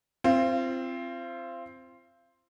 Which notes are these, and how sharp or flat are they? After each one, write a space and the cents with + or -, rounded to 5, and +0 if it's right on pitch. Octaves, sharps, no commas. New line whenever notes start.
C4 +0 F4 -35